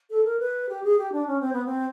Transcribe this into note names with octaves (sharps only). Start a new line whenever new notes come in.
A4
A#4
B4
G4
G#4
G4
D4
C#4
C4
B3
C4